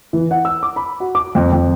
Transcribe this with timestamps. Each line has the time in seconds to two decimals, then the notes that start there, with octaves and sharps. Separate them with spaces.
0.13 E3
0.31 F#5
0.45 E6
0.63 D6
0.76 B5
1.00 F#4
1.15 D6
1.35 F2
1.53 F2